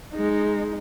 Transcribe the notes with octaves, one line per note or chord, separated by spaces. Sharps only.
G#3 D#4